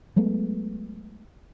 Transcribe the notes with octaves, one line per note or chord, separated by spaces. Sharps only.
F#3 G#3 A3 B3